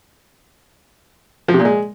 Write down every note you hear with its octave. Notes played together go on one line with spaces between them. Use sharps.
F3
C3
A#2
G#3